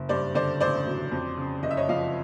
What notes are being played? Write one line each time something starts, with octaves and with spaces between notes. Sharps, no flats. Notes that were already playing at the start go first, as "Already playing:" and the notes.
Already playing: F#1
G2 C5 D5
D3 C5 D5
A1 C5 D5
F#3
F2
C#3
F#1 D#5
E5
C#5 D#5
F3 D#5 F5